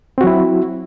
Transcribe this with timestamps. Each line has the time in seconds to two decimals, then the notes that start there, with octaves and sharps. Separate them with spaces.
0.18 C4
0.21 F#4
0.24 F#3
0.27 E4